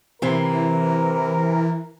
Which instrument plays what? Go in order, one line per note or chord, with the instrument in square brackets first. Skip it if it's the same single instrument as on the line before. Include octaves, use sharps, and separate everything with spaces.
[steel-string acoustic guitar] C3 C4 E4 [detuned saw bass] E3 [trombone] A#4